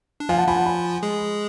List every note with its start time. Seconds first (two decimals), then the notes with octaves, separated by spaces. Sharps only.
0.20 D4
0.29 F3 F4 F5 G#5
0.38 F#5 A5
0.47 F3 F4 G#5 B5
0.56 F#5 A5
0.66 G#5 B5
1.03 G#3 G#4